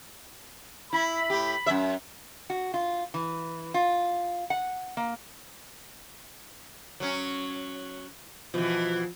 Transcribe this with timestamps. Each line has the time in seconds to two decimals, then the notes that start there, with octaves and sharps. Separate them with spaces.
0.93 E4 B5
1.30 A2 G4
1.66 F#2 A#2 E5
2.50 F#4
2.74 F4
3.14 E3
3.74 F4
4.50 F#5
4.97 A#3
7.00 F#3 C#4
8.54 B2 E3 F3